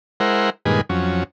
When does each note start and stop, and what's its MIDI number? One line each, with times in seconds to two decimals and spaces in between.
0.20 0.50 56
0.20 0.50 64
0.20 0.50 70
0.20 0.50 72
0.20 0.50 78
0.65 0.81 43
0.65 0.81 46
0.65 0.81 51
0.65 0.81 56
0.65 0.81 68
0.65 0.81 71
0.89 1.24 41
0.89 1.24 54
0.89 1.24 61